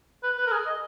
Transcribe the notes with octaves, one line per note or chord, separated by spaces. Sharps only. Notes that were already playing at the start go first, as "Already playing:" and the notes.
B4
B4
A#4
G#4
D#5